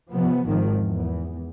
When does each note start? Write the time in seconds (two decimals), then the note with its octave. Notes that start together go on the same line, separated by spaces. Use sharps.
0.11 C3 F3 B3
0.46 G#1 G#2 D#3 F3
0.77 E2